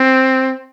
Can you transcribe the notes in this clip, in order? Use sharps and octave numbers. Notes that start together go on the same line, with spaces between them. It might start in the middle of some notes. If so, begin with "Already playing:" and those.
Already playing: C4